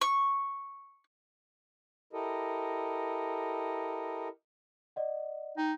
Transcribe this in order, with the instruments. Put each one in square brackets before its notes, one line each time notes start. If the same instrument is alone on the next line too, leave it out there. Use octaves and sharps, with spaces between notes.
[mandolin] C#6
[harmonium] E4 G4 A4 A#4 D#5
[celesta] D5 D#5 F#5
[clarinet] D#4 [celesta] G5